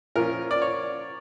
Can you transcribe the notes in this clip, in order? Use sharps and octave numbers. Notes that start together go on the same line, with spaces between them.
A#2 F3 C#4 F4 A#4
D5
C#5